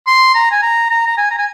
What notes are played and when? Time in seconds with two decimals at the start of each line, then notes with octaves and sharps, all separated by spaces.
0.07 C6
0.35 A#5
0.51 G#5
0.62 A#5
0.90 A#5
1.06 A#5
1.18 G#5
1.31 A#5
1.38 G#5